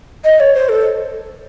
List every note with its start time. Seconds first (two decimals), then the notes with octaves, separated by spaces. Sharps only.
0.25 D#5
0.40 C#5
0.55 C5
0.69 A4